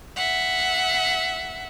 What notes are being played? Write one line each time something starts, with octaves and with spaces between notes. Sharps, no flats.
E5 F#5